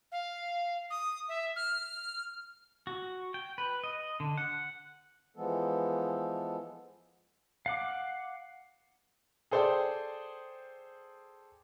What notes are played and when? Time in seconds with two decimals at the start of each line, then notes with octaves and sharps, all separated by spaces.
0.12 F5
0.90 D#6
1.29 E5
1.56 F6
2.87 F#4
3.34 G5
3.58 B4
3.84 D#5
4.20 D3
4.38 F#5
5.37 E3 F3 G#3 B3 A4
7.66 F5 F#5 D6
9.51 G#4 A4 C5 D5 G5